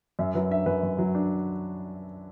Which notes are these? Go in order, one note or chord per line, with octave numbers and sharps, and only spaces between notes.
F#2 E5
F#3 B4
D4 E5
F#2 B4
F#2
F#3
D4